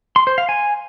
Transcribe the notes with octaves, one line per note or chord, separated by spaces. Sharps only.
C6
C5
F5
G#5